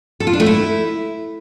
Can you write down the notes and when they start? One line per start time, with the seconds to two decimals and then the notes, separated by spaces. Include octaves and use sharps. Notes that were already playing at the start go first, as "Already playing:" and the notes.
0.20 A4
0.27 F4
0.33 D4
0.40 A3
0.46 E4